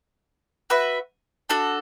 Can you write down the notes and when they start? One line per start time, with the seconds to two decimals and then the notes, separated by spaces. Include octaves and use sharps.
0.70 F#4 B4 E5
1.50 D4 F#4 A4